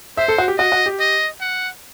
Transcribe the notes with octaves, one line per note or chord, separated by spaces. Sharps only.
C5 E5
A4
F#4
G4
F#4 D#5
F#4
G4
D#5
F#5